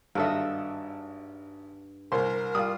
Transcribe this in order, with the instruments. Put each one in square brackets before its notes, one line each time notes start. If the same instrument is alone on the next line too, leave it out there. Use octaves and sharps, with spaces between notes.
[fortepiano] G#1 A4 E5 [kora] G2 F#4 D#5
[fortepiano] C2 C5 C6 [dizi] A#4
[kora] G3 F4 [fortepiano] D#6